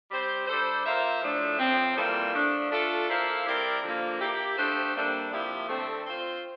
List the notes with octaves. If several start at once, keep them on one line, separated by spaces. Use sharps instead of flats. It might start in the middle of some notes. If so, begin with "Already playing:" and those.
G3 C4 G4 C5
G3 D4 A4 C5
A#3 F4 C5 E5
A2 F3 A3 D4 A4
A2 F3 C4
E3 G3 A#3 F4 A4
F3 A3 D4
A3 D4 F4 A4
A#3 E4 A4 C5 F5
G3 C4 E4 A#4 D5
D3 F3 A#3
A#3 E4 G4
F3 A3 D4 G4 C5
C3 G3 A#3 D4 A4
C3 F3 A#3 E4 G4
D3 A3 C4
C4 F4 C5